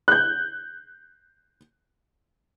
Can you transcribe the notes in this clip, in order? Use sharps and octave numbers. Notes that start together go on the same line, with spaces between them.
F#6 G6